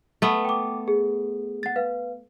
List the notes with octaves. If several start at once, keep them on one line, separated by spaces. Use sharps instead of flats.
A3 B3
G5 D6
G#4
F#5 A6
B4 F5